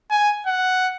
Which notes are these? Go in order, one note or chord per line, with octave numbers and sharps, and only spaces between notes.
G#5
F#5